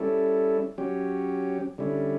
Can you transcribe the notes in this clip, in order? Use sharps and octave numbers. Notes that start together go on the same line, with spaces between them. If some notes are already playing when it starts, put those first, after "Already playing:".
Already playing: G3 C#4 E4 A4
F#3 C#4 G4
D3 G3 C#4 E4